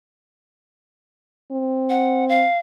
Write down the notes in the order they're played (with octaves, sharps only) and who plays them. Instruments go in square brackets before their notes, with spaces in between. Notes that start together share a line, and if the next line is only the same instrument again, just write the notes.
[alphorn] C4
[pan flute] F#5
F5